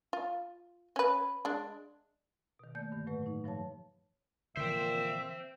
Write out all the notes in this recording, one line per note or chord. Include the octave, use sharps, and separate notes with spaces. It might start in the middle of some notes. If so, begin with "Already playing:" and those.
F4
C#4 B4
G#3 D4
B2 D#3
A3 A#3 D5 G6
G2 D3 D#3
A2 F#3 A3 B4
A2 D#4
G2 F3 C#5 A5
A#2 D3 E3 F3 C5 E5 G5